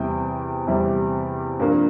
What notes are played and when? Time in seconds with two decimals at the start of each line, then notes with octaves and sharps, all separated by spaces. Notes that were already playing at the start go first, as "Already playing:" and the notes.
Already playing: E2 C3 G3 C4 G5
0.67 E2 C3 G3 C4
1.59 G2 F3 A#3